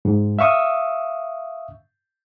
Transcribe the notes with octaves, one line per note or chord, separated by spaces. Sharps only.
G#2
E5 F5 C#6 D#6 E6